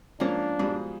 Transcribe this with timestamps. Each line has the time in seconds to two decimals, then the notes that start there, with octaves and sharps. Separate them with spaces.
0.20 G#2 F3 A#3 C#4 D4 A5 A#5
0.59 G#2 B2 G3 G#4